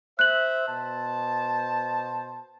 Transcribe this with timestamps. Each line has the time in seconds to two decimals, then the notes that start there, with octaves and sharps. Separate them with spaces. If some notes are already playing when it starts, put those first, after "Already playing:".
0.19 C5 E5 F#6 F#7
0.67 B2 C5 A5